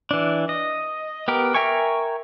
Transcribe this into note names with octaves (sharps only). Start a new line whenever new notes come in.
E3 D4
D#5
B3 G4 A#4
A#4 E5 G5 G#5 C#6